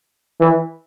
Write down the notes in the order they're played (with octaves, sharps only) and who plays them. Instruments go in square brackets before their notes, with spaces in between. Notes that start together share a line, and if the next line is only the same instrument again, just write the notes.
[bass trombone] E3